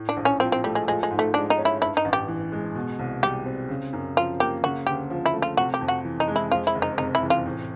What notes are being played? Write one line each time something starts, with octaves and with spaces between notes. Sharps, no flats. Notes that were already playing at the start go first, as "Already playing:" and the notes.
Already playing: A2
D4
A#1
C#4
F3 C4
C4
G3 A3
G#3
F3 G#3
G#3
G#2
A3
G#3 D4
D#4
C#4
E4
G2 E4
D#4
A1
G4
E3
G#3
B2
C2
G3 G4
C4
C#3
F#2
F3 F4
A#3 G4
C#3 F#4
D2 G4
F3
E4
A3
F4
C3 F#4
G4
F2
F#4
E3
D#4
G#3
E4
F2 F4
E4
F#1
D#4
C3 D#4
E4
E3
F4
A2